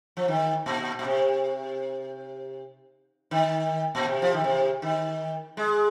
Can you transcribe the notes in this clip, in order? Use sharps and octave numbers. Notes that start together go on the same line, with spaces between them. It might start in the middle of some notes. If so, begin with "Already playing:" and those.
F3
D#3
A#2
A#2
C3
D#3
A#2
C3
F3
D#3
C3
D#3
G#3